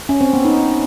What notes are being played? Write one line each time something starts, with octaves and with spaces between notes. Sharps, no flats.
C#4
C4
B3
D#4